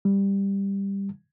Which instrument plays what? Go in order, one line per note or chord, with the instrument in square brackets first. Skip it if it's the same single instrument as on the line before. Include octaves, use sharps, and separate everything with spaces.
[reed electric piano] G3